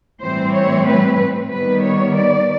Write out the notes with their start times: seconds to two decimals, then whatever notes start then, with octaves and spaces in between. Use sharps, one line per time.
0.21 A2 E3 G3 C4 C5
0.54 C#5
0.86 B4
1.51 D#3 G3 B3 B4
1.83 C#5
2.16 D5